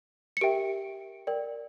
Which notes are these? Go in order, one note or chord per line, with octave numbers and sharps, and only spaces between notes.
C#7
G4 A#4 E5 G5 D7
A#4 D5 G5